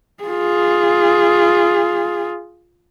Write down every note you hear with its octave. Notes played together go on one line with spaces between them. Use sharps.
F4 G#4